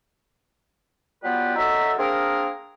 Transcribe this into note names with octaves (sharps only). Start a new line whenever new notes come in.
F#3 G3 B3 F4 G4 B4
F#3 D#4 F#4 A4 E5
A#3 C4 D4 G#4 A#4